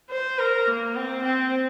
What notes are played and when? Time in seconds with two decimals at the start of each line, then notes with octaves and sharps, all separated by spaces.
0.10 C5
0.39 A#4
0.68 A#3
0.96 C4
1.24 C4